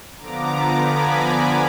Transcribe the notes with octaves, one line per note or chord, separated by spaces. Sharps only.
D3 F3 B3 A#5 D6
G#5 B5